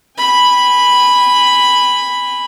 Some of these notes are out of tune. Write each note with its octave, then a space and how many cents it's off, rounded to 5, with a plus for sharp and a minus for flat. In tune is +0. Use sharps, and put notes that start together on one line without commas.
G#5 -30 B5 +0